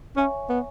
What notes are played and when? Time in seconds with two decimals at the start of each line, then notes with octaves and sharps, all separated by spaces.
0.16 C#4 C#5 E5 G#5 C#6
0.49 B3